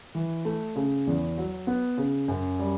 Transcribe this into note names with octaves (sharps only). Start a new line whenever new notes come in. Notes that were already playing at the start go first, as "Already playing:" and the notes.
E3
A3
C#3
E2
F#3
B3
C#3
F#2
G3